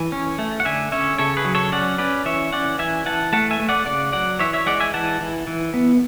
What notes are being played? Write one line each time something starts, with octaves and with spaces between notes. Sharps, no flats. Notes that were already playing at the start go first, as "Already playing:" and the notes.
Already playing: E3 G#5
C#4
A3
F#5
D3 E5 G#5
C#4 C#5 E5
C#3 A4 C#5
G#4 B4
F#3
A4 C#5
C#4 D5 F#5
C#4 B4 D5
E3 C#5 E5
C#4 D5 F#5
E3 E5 G#5
E3 F#5 A5
A3 F#5 A5
E5 G#5
A3
D5 F#5
C#3 D5 F#5
F#3 D5 F#5
E3 C#5 E5
C#5 E5
G#3 D5 F#5
E5 G#5
E3 F#5 A5
E3
E3
B3